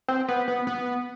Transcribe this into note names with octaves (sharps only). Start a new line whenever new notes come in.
C4
B3
B3
B3